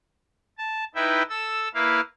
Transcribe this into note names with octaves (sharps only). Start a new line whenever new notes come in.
A5
D#4 E4 B4 E5 G5
A4 E6
A#3 E4 B4 F5